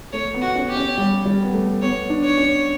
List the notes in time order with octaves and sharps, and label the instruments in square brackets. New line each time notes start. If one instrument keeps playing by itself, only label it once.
[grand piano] A3 [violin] C#5
[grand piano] B3
[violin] F#4
[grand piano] C#4
[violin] G4
[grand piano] C#4
G3
G3
B3
A3
[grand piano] B3 [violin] C#5
[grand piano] D4
[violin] C#5
[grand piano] C#4